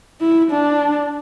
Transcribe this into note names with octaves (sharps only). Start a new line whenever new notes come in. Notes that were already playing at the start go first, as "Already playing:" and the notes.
E4
D4